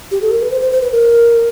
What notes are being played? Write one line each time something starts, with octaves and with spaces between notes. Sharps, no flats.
G4
A4
A#4
B4
C5
C5
C5
B4
A#4